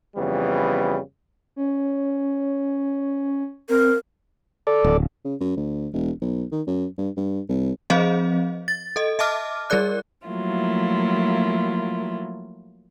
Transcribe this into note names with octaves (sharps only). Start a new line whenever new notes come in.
F2 C#3 E3 G3 B3
C#4
C4 A#4
A4 D5
D1
C#3
F#2
D2
E1
B1
D#3
F#2
G2
G2
C2
F3 C4 G#4 C5 D#5 F5
A6
A4 D#5
D#5 E5 A5 D6 F6
G3 G#4 A#4 D5 F#6
F3 F#3 A3 A#3 E4 F4